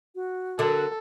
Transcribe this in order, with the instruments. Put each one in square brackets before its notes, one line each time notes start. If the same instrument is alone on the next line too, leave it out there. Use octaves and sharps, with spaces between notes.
[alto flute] F#4
[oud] D3 F#3 [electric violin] A4 [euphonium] A#4